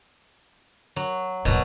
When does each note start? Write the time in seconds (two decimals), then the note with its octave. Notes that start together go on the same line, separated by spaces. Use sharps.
0.96 F#3
1.45 D#1 G2 B2 F#3